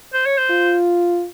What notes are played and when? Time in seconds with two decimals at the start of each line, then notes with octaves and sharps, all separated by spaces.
0.13 C5
0.26 C#5
0.38 C5
0.50 F4